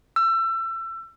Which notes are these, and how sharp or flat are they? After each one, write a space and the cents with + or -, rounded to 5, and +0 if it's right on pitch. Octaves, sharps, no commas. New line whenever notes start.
E6 +30